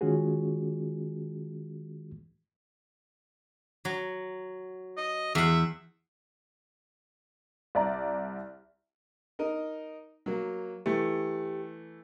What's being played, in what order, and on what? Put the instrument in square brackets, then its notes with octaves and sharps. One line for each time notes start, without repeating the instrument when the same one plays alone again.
[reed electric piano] D#3 G#3 C#4 F4 F#4 G#4
[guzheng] F#3
[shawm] D#5
[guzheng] E2 F#5 [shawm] E5
[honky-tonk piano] C2 D5 A#5
[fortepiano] D#4 A#4 D#5
F#3 A#3
[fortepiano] E3 A3 [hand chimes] G4